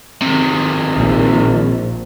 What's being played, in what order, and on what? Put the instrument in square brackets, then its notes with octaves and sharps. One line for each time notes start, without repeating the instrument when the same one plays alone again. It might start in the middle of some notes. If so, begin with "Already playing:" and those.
[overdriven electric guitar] C3 D#3
[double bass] A#1